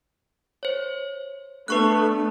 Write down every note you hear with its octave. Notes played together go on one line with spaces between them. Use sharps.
C5 C#5
A3 B3 D4 B4 C#6 F#6